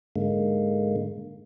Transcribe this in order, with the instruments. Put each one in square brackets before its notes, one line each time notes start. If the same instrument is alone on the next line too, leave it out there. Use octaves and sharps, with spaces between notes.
[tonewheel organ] G#2 D3 G#3 A#3